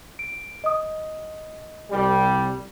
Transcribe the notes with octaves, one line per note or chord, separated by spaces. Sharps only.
D7
D#5 D#6
C2 G3